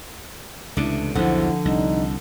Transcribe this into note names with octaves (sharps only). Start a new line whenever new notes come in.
C#2 C3 E3 A3 D4 E4
B1 E2 D3 F3 E4 C5 F#5
C2 D4 D#4